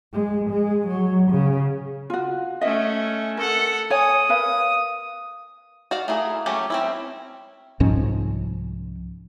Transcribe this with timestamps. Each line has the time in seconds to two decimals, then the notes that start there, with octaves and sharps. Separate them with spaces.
0.14 G#3
0.50 G#3
0.88 F#3
1.31 C#3
2.10 F4 F#4
2.61 A3 C#4 D#5 E5
3.37 A4 A#4 F#5
3.90 C#5 G#5 D#6
4.29 A#4 B4 F5 D#6
5.91 F#4 D5 F5
6.08 A3 A#3 E4 G#4
6.46 F#3 A3 C#4 G4
6.70 C4 C#4 E4
7.80 C2 G#2 F3 C#4